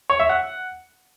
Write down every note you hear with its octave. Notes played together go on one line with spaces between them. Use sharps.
C#5
E5
F#5